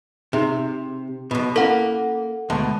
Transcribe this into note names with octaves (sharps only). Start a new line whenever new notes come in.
C3 D#4 G#4 E5
B1 B2
A#3 C#4 E4 A4 F#5
D2 B2 G#3 A5